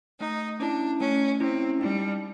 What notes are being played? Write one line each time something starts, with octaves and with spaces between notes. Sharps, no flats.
A3 D#4
C#4 D4 E4
A3 C#4
C4 C#4 E4
G3 D#4